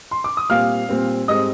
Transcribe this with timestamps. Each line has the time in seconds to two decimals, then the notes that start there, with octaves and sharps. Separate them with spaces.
0.11 C6
0.24 D6
0.37 D#6
0.50 A#2 G3 C4 F5 F6
0.89 A#2 G3 C4
1.28 G#2 G3 C4 D#5 D#6